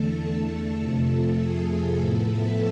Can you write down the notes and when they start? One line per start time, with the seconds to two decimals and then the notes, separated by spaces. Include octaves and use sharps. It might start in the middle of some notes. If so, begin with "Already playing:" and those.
Already playing: E2 D3 A3 A4
0.80 F2 C3 F3 A3
1.39 G#4
1.99 A2 F3 B3 A4
2.29 E5